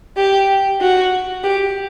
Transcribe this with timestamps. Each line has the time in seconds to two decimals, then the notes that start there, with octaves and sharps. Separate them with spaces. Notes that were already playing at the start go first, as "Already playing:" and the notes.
0.16 G4
0.80 F#4
1.43 G4